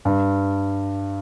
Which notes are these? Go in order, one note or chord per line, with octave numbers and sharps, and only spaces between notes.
G2